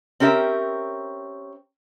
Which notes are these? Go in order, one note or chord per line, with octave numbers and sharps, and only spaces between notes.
C4 C#4 G4 A#4 E5